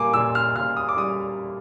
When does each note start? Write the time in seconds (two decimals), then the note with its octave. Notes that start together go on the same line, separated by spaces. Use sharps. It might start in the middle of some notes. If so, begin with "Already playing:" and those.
Already playing: A#2 G3 A#3 G#5 D6
0.14 A#2 E6
0.35 F6
0.56 A#2 F6
0.77 D#6
0.89 D6
0.97 G3 D#6